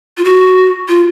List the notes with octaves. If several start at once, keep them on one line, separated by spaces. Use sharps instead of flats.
F4
F#4
F4